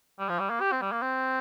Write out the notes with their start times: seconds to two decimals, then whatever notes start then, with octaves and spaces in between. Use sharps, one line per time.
0.19 G3
0.29 F3
0.39 G3
0.50 A#3
0.61 G4
0.72 C4
0.82 G3
0.92 A#3
1.02 C4